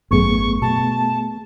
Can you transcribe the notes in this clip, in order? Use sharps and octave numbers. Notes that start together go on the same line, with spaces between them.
G#1 F#2 A3 B3 G#4 C#6
B2 A5